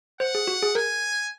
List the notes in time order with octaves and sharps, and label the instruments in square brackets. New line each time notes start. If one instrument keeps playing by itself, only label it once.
[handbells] C5 [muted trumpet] F#5
[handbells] G#4
F#4
G#4
[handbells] A#4 [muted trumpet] G#5